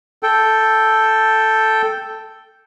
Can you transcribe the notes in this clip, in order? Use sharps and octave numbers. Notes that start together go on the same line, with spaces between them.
A4 G5